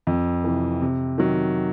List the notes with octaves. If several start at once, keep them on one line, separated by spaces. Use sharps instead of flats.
F2
C3 E3
C3
D#3 F#3